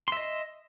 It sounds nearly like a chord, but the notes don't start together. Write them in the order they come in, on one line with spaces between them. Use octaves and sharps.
C6 E5 D#5